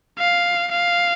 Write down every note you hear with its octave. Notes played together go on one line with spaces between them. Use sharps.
F5
F5